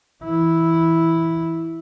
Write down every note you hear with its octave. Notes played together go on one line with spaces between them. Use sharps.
E3 E4